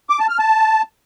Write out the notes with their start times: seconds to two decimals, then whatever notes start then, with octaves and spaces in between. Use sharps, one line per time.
0.10 D6
0.19 A5
0.29 F6
0.39 A5